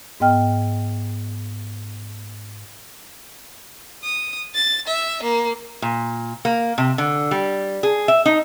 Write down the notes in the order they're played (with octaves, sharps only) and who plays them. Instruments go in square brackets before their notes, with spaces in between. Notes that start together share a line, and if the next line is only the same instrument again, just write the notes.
[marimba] G#2 B3 D#5 G5 F6
[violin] D#6
A6
E5
A#3
[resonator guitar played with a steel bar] A#2
A#3
C3
D3
G3
G#4
E5
D#4